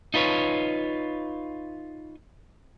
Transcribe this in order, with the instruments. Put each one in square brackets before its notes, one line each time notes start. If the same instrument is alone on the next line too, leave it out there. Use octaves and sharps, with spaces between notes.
[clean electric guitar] D#4 F4 B4 C#5